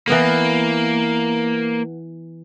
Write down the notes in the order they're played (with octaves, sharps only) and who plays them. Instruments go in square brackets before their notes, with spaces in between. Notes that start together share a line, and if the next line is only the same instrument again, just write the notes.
[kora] E3 B3 A#4 [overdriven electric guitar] A#3